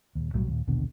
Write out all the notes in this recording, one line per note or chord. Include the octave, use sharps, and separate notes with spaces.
D#1 D#2
B1 A2 F#3 G3
D#2 A#2
A#1 D#2 B2 D3